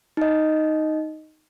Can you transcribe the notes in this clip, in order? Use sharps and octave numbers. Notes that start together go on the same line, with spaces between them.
D#4 D#5